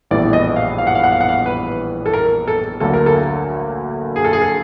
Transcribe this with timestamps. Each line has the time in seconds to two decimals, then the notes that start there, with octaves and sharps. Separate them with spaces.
0.11 A#1 A2 E3 G3 B3 D5
0.33 D#5
0.56 F5
0.78 F5
0.87 F#5
0.95 F5
1.04 F#5
1.12 F5
1.21 F#5
1.29 F5
1.46 B4
2.06 A4
2.14 A#4
2.48 A4
2.80 D2 D3 F#3 A#3 A4
2.94 A#4
3.06 A4
4.16 G#4
4.24 A4
4.33 G#4
4.42 A4